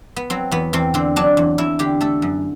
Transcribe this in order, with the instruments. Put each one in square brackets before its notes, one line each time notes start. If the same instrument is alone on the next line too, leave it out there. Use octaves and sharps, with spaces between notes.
[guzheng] B3
F#3 C4
E2 B3
E2 C4
D3 C4
F#3 D4
E2
E2 E4
D3 G4
A3 A4
F#2